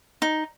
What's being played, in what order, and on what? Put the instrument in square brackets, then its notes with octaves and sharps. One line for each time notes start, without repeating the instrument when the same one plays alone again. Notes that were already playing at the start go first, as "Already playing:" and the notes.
[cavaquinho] D#4